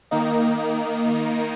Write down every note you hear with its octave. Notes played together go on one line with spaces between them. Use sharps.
D#3 A#3 D#4